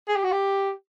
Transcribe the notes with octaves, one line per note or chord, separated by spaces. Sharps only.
G#4
G4
F#4
G4